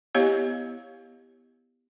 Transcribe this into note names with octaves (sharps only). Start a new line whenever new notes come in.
B3 E4 G4 C#5 D#5 F5